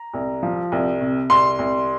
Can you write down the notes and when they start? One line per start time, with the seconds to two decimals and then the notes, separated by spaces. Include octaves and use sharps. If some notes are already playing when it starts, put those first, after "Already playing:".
Already playing: A#5
0.14 C2
0.43 F3
0.72 C2
1.01 C3
1.30 C2 C6
1.59 C2